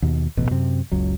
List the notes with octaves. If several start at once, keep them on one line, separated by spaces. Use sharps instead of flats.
D#2 B2
D#1 A1 B2
F#2 C3 C4
F#1 C#2 F#3